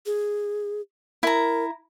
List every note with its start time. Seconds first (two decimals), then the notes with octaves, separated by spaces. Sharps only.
0.06 G#4
1.23 E4 A#4 A#5